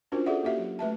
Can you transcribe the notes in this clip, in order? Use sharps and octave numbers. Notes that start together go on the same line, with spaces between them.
C#4 D4 F4 F#4 A#4 C5
F#4 G#4 A4 D5 E5 F#5
A#3 F#4 G4 E5 F5
F#3 E5
A3 B4 E5 A5